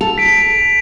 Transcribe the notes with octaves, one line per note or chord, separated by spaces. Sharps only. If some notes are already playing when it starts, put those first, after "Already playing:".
A4 F7
B6 D7